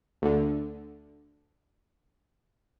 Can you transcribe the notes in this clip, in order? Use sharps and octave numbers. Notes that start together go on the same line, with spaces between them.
D2 D3